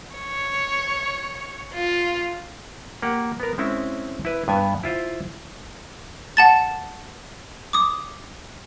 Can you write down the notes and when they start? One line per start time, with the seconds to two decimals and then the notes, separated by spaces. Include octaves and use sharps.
0.15 C#5
1.73 F4
3.02 A#3 G4 F#5
3.40 B3 A#4
3.58 G#3 C4 C#4 E4
4.25 E4 B4
4.48 G2 B3 G#5
4.83 E4 F4 C5
6.37 F#5 A5 A6
7.73 D6 D#6